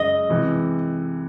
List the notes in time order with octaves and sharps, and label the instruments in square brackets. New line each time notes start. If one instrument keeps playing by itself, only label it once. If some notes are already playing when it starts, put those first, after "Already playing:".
Already playing: [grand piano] F#2 C#3 G#3 [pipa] D#5
[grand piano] C3 E3 G#3